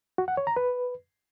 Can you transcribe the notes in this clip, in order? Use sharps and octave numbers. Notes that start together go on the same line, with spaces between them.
F#4
F#5
C#5
A#5
B4